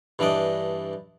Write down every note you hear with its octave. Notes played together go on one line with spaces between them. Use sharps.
G2 E3 D4 D5 D#5